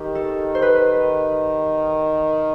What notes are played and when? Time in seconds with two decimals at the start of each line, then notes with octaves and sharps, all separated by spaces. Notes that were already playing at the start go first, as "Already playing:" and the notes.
Already playing: D#3 G4
0.15 A4
0.55 C5
0.62 B4